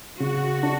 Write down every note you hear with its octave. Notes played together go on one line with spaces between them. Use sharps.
C#3 F#4
D4